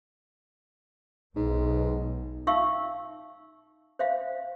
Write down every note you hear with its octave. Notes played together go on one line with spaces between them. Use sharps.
B1 G#2
D#4 E5 F5 C#6 E6
C5 E5 F5